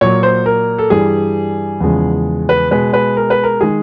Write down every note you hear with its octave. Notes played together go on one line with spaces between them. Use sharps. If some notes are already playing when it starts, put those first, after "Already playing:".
A#2 F#3 C#5
C5
A#4
A4
G2 E3 G3 G#4
E2 C#3 F3 G#3
B4
B2 G#3 B4
B4
A#4
B4
A#4
D#3 G#3 G#4